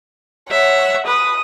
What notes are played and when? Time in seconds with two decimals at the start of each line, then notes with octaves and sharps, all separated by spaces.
0.50 C#5 E5 F#5
1.07 B4 D#6